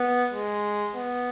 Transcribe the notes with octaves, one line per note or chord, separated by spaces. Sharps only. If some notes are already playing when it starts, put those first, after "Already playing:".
Already playing: B3
G#3
B3